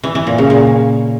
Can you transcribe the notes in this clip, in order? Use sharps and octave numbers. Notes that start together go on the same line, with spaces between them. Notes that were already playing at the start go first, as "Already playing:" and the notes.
E3
E3
A#2
C#3
A#2